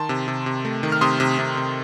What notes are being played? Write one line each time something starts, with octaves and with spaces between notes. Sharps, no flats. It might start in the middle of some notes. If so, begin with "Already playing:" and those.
Already playing: D#3 A5 C6
C3
C3
C3
A3
D#3
F6
C3 C6 D#6
C3
C3
C3